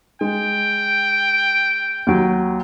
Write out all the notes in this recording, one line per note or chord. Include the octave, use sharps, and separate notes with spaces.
G#3 G5
D#2 F#3